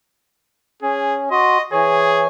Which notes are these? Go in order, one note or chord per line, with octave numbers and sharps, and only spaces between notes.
C#4 G#4
F#4 D#5 C6
E3 G#4 C#5 G#5